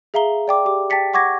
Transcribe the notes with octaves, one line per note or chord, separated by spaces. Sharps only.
G#4 E5 F5 A#5 G7
D5 G5 D6
G4 D6
G5 A5 A6 B6 C#7
F#5 C#6 D6 G#6 A#6